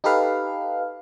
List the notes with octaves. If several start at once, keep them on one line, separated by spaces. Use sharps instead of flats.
D#4 G4 A4 B4 F5